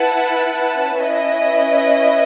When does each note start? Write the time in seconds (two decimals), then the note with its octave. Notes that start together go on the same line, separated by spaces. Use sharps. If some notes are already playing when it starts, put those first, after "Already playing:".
Already playing: E4 B4 F#5 A5
1.00 C#4 E4 B4 D#5